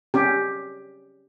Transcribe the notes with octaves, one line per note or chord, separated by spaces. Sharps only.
C#4 G4